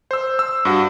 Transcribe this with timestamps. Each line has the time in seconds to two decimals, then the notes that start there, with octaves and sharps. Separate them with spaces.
0.11 C5 E6
0.39 E6
0.65 G2 F#4